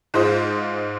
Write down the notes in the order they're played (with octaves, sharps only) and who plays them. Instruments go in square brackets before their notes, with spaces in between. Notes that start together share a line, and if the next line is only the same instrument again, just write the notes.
[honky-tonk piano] G#2 G#3 F4 C5 D#5